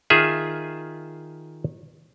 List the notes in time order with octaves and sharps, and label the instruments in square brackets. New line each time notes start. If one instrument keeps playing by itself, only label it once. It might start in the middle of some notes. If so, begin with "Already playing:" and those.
[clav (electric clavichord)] D#3 F4 G#4 E5